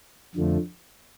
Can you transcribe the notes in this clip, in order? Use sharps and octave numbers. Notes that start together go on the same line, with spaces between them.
F2 D3 F3 A3